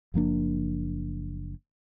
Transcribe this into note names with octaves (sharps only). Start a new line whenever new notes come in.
F#1 F3 A#3 D4